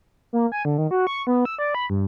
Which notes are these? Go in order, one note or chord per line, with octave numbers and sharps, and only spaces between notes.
A#3
G#5
D3
D#3
F#4
C#6
B3
E6
D5
B5
G2